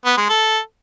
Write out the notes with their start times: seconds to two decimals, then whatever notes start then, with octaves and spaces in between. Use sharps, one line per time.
0.06 B3
0.17 G#3
0.29 A4